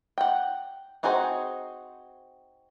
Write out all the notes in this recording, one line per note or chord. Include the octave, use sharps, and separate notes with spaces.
F#5 G5
C4 D#4 F#4 G#4 C5